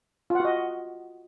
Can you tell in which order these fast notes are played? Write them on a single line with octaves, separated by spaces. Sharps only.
F4 F#5 F#4 D#5